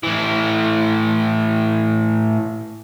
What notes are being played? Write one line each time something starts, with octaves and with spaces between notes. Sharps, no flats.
A2 E3